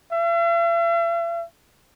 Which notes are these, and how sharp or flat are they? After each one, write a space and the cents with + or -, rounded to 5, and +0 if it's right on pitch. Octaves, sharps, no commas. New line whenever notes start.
E5 +45